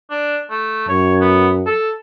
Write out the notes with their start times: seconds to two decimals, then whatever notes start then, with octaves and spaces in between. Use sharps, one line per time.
0.11 D4
0.50 A3
0.89 F#2 C#5
1.21 B3
1.66 A4